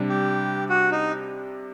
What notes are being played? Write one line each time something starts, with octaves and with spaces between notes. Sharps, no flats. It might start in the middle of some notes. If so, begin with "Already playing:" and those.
Already playing: C3 G3 D4
G4
F#4
D#4